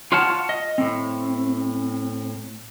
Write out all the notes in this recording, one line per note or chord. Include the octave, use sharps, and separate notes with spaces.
F4 C#5 F5 F#5 A5
D#5
A2 C4